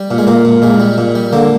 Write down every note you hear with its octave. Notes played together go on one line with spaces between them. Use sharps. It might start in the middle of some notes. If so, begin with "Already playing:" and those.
Already playing: G3
A#2
G#3
A#2 A#3
A#2
A#2 G#3
G3
A#2
G3
D3 A#3